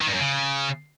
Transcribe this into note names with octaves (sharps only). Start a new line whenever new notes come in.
D#3
G2
F#2
C#3